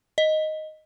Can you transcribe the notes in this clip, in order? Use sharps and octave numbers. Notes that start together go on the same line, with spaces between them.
D#5